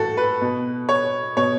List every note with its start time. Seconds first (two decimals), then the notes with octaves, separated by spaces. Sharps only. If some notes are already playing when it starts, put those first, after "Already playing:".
Already playing: A2 E3 F#4 A4
0.17 B4
0.41 B2
0.89 C#5
1.37 B2 C#5